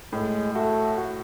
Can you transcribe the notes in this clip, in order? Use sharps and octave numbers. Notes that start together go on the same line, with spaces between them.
A2 G#3
A3 F#4
F#4